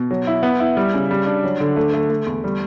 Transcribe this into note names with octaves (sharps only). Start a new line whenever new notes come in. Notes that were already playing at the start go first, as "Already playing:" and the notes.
Already playing: B2
F#3
E4
B3
E4
G3
C#3
G3
D4
F#3
D3
A3
A3
A3
E2
G3